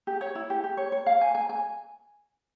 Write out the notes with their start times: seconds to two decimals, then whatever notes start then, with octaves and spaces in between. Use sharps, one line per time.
0.07 G4
0.21 C#5
0.35 E4
0.50 G4
0.64 G4
0.77 C#5
0.92 C#5
1.06 F5
1.21 G#5
1.35 G#5
1.49 G#5